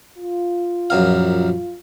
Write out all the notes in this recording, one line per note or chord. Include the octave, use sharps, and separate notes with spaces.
F4
A#1 F#2 F5